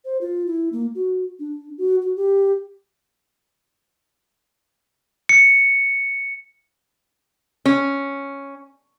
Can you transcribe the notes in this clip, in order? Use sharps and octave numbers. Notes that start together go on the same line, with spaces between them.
C5
F4
E4
A#3
F#4
D4
F#4
F#4
G4
C#7
C#4